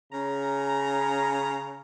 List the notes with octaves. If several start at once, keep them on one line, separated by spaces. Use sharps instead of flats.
C#3 A#5